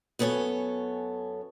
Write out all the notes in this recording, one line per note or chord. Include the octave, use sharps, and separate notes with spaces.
F#2 B3 A4 C#5 G#5